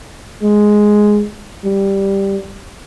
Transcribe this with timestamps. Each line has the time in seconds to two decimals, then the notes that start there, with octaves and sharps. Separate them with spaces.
0.43 G#3
1.65 G3